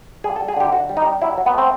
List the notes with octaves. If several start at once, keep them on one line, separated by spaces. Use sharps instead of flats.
G3 G#4
A4
G3
G#4
D3 G4
D3 F#4
G3
D#4
G3
F#3 E4
F#3
B3
A3 C4